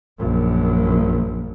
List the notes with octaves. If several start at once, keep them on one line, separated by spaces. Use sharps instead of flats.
A#1 F#2